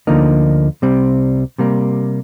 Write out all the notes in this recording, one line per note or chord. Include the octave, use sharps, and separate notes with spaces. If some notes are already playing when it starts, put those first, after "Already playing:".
D2 D3 F3 A#3 D#4
C2 C3 G3 C4
C3 G3 A#3